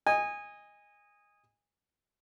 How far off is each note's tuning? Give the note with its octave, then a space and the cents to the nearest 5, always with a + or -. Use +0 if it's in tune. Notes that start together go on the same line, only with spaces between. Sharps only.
D#5 +0 G#5 -20